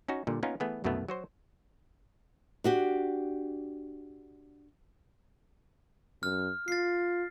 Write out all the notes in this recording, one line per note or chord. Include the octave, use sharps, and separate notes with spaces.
C#4 D#4 F#4
A#2 D3 G3
A#3 B3 C#4 D#4 F4 A#4
E3 A3 B3 G#4
C2 F#2 B2 D#3 A3 B3
F#3 F#4 C5
D4 F#4 G4
F#2 F6
F4 A6 C7